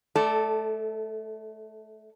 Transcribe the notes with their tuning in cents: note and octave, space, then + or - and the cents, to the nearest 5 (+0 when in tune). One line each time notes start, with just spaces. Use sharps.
A3 -25 A4 +0 D5 +0